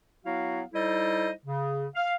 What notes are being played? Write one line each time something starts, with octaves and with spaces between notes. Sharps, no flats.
F#3 B3 E4 F#4 F5
G3 D#4 E4 A4 C5 D#5
C#3
F5